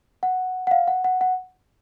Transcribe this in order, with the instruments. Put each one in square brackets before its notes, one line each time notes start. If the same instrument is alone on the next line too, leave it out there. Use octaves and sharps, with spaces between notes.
[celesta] F#5
F#5
F5
F#5
F#5
F#5